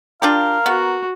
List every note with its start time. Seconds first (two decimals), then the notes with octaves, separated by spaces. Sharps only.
0.22 D4 F4 G4 A#4 F5
0.66 B3 F#4